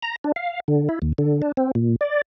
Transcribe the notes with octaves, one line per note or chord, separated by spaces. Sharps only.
A#5
D4
F5
D3
E4
D#2
D3
D4
C4
A#2
D5